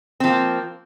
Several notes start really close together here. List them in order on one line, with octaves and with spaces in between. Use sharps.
C4 F3 A#3